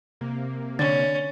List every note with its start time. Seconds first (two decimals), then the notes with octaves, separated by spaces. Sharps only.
0.21 C3 A#3
0.79 D3 C#4 A6